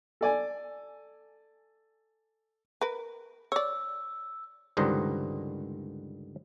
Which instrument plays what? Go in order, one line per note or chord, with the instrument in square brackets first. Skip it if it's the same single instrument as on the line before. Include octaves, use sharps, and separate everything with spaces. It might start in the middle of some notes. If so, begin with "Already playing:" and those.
[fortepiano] A4 D5 G#5
[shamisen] A#4 B4
[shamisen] C#5 D5 [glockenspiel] E6
[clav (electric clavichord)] C#2 G2 D3 D#3 C5 D#5